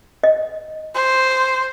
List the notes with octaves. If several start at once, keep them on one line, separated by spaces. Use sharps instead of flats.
D#5
C5